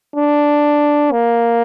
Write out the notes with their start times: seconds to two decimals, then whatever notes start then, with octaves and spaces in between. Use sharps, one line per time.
0.16 D4
1.12 A#3